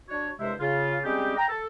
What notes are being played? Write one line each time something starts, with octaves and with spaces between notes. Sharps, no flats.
D4 F#4 C#5
C2 G2 C3 G#3 C5 E5
C#3 F4
G3 G#3 C4 C#4 D#4 G4
G5 A#5
A4